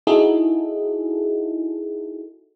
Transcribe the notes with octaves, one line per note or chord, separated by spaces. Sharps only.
D#4 E4 F#4 G#4 A4